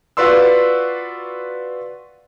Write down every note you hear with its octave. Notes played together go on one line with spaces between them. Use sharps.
F4 F#4 B4 D5 C6 E6